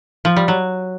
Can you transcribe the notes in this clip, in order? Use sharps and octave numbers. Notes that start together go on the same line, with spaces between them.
F3
G3
F#3